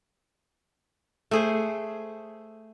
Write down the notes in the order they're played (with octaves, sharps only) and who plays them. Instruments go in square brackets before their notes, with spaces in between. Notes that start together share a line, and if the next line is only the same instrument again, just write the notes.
[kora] A3 G#4 C5